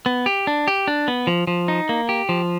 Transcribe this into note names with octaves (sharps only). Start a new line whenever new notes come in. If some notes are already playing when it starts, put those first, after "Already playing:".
B3
G4
D4
G4
D4
B3
F3
F3
D#4
A#3
G4
F3